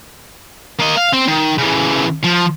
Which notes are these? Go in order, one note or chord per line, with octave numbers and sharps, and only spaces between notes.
A#3 D#5
F5
C4
D#3
C#3 E3
F3